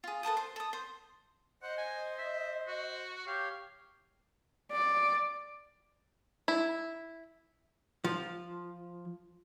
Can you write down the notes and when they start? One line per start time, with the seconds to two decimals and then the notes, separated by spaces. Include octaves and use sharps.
0.04 F4 G#4
0.23 A4 B4 A5 D#6
0.37 C5
0.56 A4 D#6
0.73 C5
1.62 C5 D#5 F#5
1.77 G#5
2.18 E5
2.67 F#4
3.27 G4 C#5 F5
4.71 D5
6.48 E4
8.04 F3